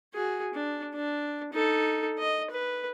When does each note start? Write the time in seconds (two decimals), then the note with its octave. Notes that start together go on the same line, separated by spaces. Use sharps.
0.14 F#4 G#4
0.54 D4
0.95 D4
1.53 D#4 A4
2.18 D#5
2.51 B4